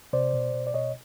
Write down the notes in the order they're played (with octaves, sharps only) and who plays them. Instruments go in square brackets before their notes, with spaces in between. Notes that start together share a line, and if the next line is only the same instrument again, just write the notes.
[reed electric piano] C3 C5 D5
B2
B2
D5
B2 C#5 D#5